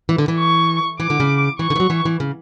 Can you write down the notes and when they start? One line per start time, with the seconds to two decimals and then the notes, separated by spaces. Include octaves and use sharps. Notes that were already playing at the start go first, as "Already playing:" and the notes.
0.09 E3
0.18 D3
0.28 E3
0.38 C#6
1.00 E3 D6
1.10 D3
1.20 C#3
1.59 E3 C#6
1.70 D3
1.76 E3
1.80 F#3
1.90 E3
2.05 E3
2.20 C#3